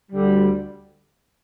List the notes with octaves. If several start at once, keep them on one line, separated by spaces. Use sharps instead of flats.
D2 D3 G3